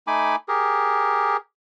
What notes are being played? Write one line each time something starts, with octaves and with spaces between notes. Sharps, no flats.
A3 D#4 G#5 B5 D6
G4 G#4 A#4